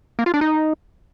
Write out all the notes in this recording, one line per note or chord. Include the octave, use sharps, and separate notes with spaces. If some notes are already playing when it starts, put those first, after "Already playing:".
A#3
F4
D4
D#4